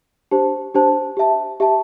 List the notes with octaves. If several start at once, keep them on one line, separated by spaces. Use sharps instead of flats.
D4 G4 C5 A5
D4 G4 C5 A5
G4 E5 A5
G4 E5 A5